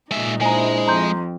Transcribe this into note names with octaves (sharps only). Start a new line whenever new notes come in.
A#2 G#3 D#4 E5
G#3 D4 E4 C5 G#5 A#5
F2 A#5 C6 G6